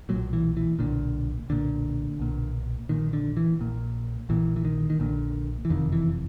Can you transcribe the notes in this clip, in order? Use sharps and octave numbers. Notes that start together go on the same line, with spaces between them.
B1 A#2 F#3
E3
E3
B1 A#2 D3
B1 A#2 D3
B1 A#2
A#1 A#2 D#3
D3
E3
A#1 A#2
A#1 A#2 E3
E3
D#3
D#3
A#1 A#2 D3
E3
F#1 F2 C3 D#3
E3